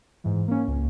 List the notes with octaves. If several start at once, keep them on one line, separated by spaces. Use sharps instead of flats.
G#2 E3
A#3 C#4
C#2